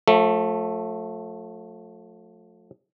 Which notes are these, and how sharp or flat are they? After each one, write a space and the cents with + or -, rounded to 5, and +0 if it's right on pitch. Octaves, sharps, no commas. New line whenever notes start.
F3 +40 A3 +0